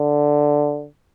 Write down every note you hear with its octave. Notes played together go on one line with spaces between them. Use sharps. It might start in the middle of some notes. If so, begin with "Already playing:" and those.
Already playing: D3